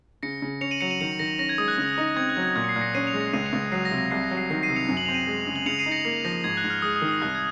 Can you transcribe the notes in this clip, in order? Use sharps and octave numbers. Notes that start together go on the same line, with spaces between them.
C#3 A#6 C#7
C#3
C#4 C#7 F7
D#7 F#7
F#3 C#7 F7
D#7 F#7
D#3 C#7 F7
D#3 A#6 C#7
C#4 A#6
G#6
G#3 D#6
F#6
C#3
D#4
C4 G#6
F#6
F#3
G#6
A#2 G#6
C#7
C7
A#2
A#6 C#7
C#4 C7 D#7
C#7 F7
G#3
A#6 C#7
C#2 C7 D#7
C#7 F7
C#2
F#3 C7
A#6
C3
A#6
C2 C7
A#6
F#3
C7
D#3 C7
C7 D#7
C3
C#7 F7
F#2
F#7
C4 F7
D#7 F#7
G#3
C#3
F#7
C#3 C#7 F7
C7 D#7
D#4
A#6 C#7
A#3 C7
F3 A#6
G#2 G#6
F#6
G#2
F6
G#3 D#6
D#6
D#3
D#6
C2 F#6
G#6